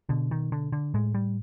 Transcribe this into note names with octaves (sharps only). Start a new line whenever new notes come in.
B2 D3
D#3
D3
D3
A2 G#3
G3